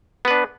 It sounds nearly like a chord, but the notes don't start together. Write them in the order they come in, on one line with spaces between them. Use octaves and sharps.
B3 B4 D4